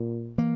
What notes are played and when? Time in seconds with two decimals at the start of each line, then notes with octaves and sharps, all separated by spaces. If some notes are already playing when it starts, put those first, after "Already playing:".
Already playing: A#2
0.38 E3 A#3